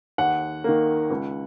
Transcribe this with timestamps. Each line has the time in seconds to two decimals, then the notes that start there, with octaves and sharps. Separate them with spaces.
0.18 D#2 F#5
0.64 D#3 A#3
1.11 C#2